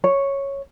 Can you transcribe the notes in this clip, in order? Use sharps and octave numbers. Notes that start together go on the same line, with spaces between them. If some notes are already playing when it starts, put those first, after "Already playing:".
C#5